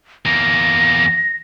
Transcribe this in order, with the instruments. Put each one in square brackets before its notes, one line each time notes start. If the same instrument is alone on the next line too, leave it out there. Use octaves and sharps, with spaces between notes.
[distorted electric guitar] E2 A#3 [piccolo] A#6